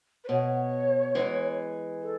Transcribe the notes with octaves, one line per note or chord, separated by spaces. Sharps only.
B4
B2 C#5
E3 G#3
A4